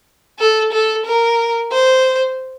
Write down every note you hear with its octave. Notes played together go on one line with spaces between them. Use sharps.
A4
A4
A#4
C5